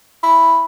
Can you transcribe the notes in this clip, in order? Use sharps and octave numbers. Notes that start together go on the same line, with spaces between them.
E4